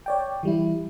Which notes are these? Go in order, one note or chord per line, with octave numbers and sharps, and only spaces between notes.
C#5 D5 G5
E3 G3 E4